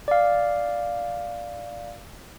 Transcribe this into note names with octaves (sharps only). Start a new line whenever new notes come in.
D5 F5